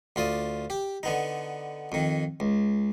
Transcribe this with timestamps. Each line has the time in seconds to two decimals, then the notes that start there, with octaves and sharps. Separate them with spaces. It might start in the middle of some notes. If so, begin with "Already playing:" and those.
0.16 D2 F4 D5 D#6
0.70 G4
1.03 D3 B3 D#4
1.92 F2 D#3
2.40 C#2